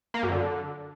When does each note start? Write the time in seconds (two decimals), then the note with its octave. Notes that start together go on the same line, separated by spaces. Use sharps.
0.14 A#3
0.23 F#2
0.32 D3